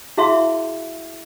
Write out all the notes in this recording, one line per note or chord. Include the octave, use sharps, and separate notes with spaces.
E4 F#4 G#4 E5 F5 C6